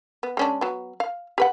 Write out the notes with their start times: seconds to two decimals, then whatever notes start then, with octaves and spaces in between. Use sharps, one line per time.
0.23 B3
0.37 G#3 C#4 D4
0.61 F#3 B3
1.00 F5
1.38 G4 B4 F#5